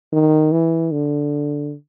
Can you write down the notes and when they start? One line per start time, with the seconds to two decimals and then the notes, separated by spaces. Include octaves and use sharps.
0.12 D#3
0.52 E3
0.92 D3